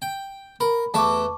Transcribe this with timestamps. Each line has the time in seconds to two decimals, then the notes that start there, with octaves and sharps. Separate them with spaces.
0.02 G5
0.60 A#4 B5
0.94 E2 A3 E5 A5 C#6 D6